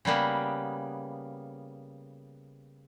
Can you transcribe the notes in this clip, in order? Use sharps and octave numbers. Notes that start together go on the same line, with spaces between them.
C#3 G3 A#3 B3